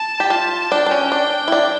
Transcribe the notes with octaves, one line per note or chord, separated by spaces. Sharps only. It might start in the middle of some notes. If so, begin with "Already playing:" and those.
Already playing: A5
G4
F4 A5
D4 G5
D4
C#4
D4
E4
D4